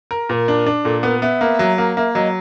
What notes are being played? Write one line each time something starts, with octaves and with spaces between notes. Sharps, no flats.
A#4
A#2 A#4 B4
D4
D4
A#2 A4
B3 A#4
B3 E5
A#3
F#3
A#3
A#3 E5
F#3 D#5